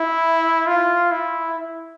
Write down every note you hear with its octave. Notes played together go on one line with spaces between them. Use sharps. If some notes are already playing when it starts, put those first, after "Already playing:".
Already playing: E4
F4
E4